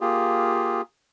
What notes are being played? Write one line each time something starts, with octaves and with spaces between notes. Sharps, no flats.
A#3 F4 G4 G#4